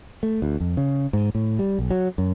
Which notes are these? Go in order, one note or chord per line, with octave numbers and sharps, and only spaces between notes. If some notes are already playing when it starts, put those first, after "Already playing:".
A3
D2
F2
C#3
G#2
A2
G3
B1
F#3
F#2